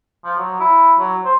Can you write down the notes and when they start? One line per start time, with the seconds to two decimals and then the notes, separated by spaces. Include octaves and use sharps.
0.25 F3
0.38 F#3
0.60 E4
0.99 F#3
1.25 C5